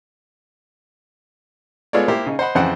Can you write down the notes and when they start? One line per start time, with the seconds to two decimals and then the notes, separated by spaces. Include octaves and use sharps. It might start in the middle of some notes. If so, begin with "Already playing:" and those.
1.93 G#3 B3 F4 A4 C#5 D5
2.08 A#3 E4 G4 C5
2.26 C#3 D#4
2.39 C5 D#5 F#5 B5
2.55 F2 C#3 E3 C5 F#5 G5